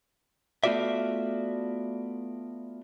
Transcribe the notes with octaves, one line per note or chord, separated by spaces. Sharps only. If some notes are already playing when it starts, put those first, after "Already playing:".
A3 B3 F4 F#4 D5 E5